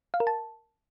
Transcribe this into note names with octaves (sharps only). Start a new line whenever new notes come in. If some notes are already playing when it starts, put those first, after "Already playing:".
F5
A#4
A5